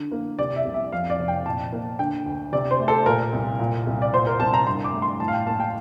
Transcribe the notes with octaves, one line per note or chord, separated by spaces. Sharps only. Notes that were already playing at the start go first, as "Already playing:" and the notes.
Already playing: D3
A#3
C3 D5
E5
C2
E5
F2 F5
D5
F1
G5
A#2 A5
A#3
D3 G5
D2
C3 D5
C5
A3
A4
A#2 A#4
C2
A#2
C2
D5
A#2 C5
A#4
C2 A5
A#5
G2 C6
D6
A3
C6
A2 A5
F5
G5
A#3 A5
G5